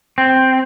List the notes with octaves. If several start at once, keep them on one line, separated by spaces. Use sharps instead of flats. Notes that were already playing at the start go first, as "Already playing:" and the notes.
C4